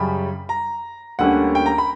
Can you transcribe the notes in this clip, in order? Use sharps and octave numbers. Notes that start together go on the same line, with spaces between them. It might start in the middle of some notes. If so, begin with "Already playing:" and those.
Already playing: F#2 C#3 G3 C#4 B5
A#5
D2 D3 G3 A#3 C#4 F#5
G5
A#5
B5